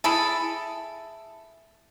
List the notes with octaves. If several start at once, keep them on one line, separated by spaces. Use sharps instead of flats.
E4 G#4 A4